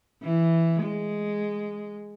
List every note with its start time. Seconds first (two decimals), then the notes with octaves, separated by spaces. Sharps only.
0.23 E3
0.83 G#3